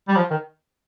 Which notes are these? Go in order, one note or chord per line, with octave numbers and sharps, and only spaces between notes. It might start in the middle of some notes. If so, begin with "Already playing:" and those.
G3
F3
D#3